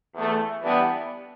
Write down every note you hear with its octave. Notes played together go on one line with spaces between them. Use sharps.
E2 E3 A3
E3 G3 B3 D4